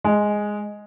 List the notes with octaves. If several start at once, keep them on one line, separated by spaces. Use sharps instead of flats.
G#3